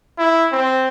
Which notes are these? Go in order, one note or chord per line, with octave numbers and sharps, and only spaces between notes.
E4
C4